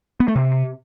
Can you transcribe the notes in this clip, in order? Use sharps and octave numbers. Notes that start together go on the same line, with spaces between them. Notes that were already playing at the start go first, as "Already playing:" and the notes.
B3
A3
C3